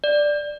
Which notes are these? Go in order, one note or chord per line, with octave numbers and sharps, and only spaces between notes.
D5